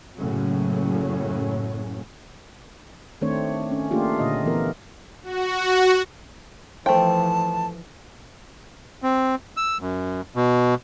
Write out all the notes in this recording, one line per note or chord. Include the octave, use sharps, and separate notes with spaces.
F#1 F#2 A2 C#3 F#3 C#4
D#3 A3 C4 D4 C5 C#5
C#4
A3 A#3 D4 F4 G4 G#4
A#2 D3 D#5
E3 B3 A#4
F#4
E3 F3 A3 C5 G5 A5
C4
E6
F#2
B2